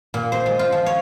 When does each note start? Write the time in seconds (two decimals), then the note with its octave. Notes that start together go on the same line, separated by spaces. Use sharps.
0.14 A#2
0.32 C5
0.46 G#3
0.59 F4
0.72 F3
0.86 C#5